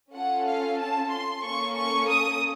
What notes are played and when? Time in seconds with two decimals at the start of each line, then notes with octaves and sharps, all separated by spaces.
0.13 C#4 F4 A4 F#5
0.46 F5
0.77 A5
1.10 C6
1.42 A#3 C#4 A4 C#6
1.74 C#6
2.07 D#6